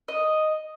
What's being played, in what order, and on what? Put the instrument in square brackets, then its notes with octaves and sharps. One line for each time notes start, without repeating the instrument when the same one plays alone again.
[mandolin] D#5